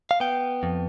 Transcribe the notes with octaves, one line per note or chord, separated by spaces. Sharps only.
F5
B3 G5
F2